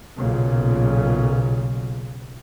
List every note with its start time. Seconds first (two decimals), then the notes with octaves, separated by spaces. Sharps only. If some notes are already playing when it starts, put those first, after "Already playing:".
0.18 B1 A#2 C#3